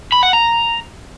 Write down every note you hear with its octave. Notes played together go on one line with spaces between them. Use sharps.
B5
F#5
A#5